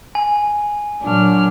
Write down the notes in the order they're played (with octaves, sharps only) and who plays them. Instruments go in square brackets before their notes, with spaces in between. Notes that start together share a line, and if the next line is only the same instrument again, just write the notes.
[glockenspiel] G#5
[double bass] A#2 F#3 [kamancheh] D4 F6